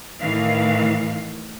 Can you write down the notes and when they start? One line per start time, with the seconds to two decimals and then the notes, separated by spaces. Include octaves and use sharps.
0.20 A2 D#3 E3 F5